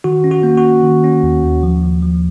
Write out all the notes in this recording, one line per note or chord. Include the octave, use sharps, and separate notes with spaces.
D#3 F#4
C#4
F#4
A#3
F#4
C#4
D#3
C#4
D#2
D#2
F3
F3
F3